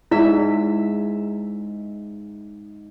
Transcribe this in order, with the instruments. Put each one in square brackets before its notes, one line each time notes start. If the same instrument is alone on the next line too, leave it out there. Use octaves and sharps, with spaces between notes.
[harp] G#2 E5 [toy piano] E4